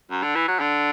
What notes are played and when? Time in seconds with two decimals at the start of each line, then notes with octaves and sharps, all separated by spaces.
0.11 F#2
0.23 D3
0.35 E3
0.48 F#3
0.60 D3